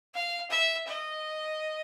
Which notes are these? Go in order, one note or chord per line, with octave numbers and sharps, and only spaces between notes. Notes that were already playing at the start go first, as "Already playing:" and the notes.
F5
E5
D#5